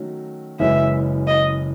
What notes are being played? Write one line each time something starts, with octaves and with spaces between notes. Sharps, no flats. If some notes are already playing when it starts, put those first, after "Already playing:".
Already playing: D#3 F#3 A3 C#4 F#4
F#1 F#2 E3 G#3 C#4 E5
D#5